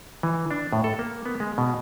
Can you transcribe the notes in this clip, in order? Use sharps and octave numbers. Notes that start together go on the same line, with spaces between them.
E3
D4
A2
A4
A#3
B3
G#3
B2